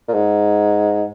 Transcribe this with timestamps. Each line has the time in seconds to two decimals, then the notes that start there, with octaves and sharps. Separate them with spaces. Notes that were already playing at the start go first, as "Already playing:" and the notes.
0.08 A#2
0.14 G#2